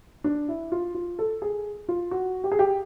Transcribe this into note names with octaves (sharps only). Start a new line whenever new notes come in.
D4
E4
F4
F4
A4
G#4
F4
F#4
G4
G#4
G4